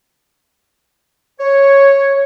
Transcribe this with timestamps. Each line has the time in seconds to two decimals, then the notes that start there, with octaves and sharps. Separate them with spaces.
1.40 C#5